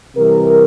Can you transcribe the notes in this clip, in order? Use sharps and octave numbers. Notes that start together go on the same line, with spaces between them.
C3 E3 G3 A#4